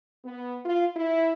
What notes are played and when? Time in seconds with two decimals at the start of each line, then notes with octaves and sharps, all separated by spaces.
0.24 B3
0.65 F4
0.95 E4